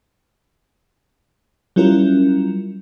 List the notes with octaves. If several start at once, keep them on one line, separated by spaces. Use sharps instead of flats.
F#3 G3 C#4 E4 F4 A#4